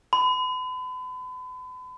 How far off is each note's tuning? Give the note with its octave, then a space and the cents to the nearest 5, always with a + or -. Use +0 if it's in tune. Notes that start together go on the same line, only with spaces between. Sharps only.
B5 +40